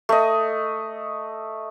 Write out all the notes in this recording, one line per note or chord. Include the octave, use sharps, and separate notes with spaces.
A3 D#5